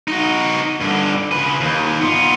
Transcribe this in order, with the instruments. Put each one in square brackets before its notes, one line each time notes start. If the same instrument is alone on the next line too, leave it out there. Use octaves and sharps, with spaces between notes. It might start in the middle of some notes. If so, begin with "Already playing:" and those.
[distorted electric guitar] D#4 F#4
G2 D3
C#3 B4
D#2
B3 F4